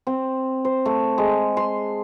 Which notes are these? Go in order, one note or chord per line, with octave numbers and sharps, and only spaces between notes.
C4
C5
A3
G#3
C6